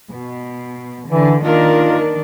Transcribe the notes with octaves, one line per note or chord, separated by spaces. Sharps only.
B2
D3 E3
D#3 A#3 D4 F4 A#4